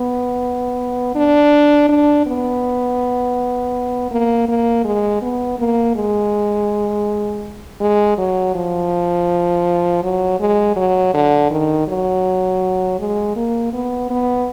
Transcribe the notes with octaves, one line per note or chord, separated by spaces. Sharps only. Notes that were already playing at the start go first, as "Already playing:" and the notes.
Already playing: B3
D4
D4
B3
A#3
A#3
G#3
B3
A#3
G#3
G#3
F#3
F3
F#3
G#3
F#3
D3
D#3
F#3
G#3
A#3
B3
B3